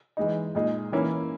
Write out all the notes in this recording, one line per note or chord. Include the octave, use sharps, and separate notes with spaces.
E3 G#3 D#4
A#2 G#3 D#4 G#4
E3 A#3 C#4 E4